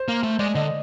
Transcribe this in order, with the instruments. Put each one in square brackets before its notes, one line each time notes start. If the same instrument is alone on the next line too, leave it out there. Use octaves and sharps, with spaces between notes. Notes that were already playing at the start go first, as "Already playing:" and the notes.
Already playing: [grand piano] C5
[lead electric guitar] A#3
A3
[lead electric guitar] G#3 [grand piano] D5
[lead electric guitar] D3 [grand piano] D#5